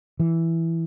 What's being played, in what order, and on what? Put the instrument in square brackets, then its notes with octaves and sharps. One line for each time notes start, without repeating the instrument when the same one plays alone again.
[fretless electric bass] E3